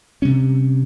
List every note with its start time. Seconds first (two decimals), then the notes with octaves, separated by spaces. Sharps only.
0.22 C3 G3 C#4